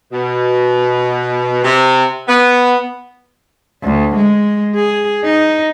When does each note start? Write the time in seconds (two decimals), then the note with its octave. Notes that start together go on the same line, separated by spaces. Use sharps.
0.12 B2
1.64 C3
2.28 B3
3.83 D2
4.16 G#3
4.75 G#4
5.24 D#4